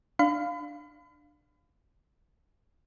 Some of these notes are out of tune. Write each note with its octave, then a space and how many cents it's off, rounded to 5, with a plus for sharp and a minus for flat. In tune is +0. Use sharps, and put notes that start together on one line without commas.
D4 +10 F5 +0 B5 +40